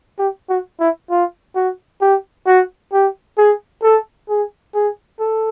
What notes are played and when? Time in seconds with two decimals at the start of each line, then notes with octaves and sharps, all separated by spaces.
0.19 G4
0.49 F#4
0.80 E4
1.10 F4
1.55 F#4
2.01 G4
2.46 F#4
2.93 G4
3.38 G#4
3.83 A4
4.29 G#4
4.74 G#4
5.20 A4